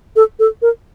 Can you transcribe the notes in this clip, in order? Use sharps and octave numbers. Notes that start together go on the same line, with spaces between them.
A4
A4
A#4